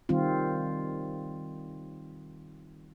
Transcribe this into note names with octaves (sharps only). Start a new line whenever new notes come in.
D#3 G3 C4 F4